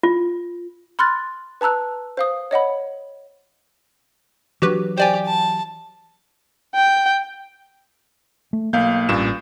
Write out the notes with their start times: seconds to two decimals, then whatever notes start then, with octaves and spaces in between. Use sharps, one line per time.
0.03 F4
0.99 B5 C6 F6 F#6 A6
1.61 B4 A5 A#5 E6 F#6
2.17 C5 F5 D#6
2.51 C#5 D#5 F#5 B5
4.62 E3 F#3 D4 F#4 G4 B4
4.98 G4 C5 D5 G#5
5.27 A5
6.75 G5
8.53 A3
8.73 B1 A#3 F5 G6
9.09 A1 G2 A#2 C#4 E7